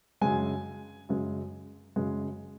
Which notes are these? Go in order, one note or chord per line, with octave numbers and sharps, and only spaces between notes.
F#2 C#3 G#3 G#5
F#2 C#3 G#3
F#2 C#3 G#3